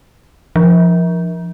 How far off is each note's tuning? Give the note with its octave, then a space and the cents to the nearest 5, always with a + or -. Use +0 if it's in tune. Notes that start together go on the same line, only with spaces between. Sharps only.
F3 -15